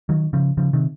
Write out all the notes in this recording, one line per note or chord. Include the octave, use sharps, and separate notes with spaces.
D#3 F#3
C#3 F3
C#3 F3
C3 D#3